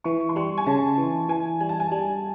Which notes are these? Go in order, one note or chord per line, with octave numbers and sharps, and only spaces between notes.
E3 C#6
C6
G3 C#6
G#5
C#3 A5
E3
E3 G#5
G3 G#5
A5
G#5
G3